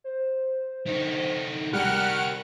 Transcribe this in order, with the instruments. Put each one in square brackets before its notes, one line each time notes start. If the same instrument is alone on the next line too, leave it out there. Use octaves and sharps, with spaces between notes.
[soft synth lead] C5
[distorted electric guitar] D3 D#4 [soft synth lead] C5
[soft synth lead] C3 [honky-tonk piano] G3 [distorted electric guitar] G4 A#4 [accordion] F#5 F6 F#6